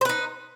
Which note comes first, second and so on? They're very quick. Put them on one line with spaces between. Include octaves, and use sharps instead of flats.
C5 B4 D#4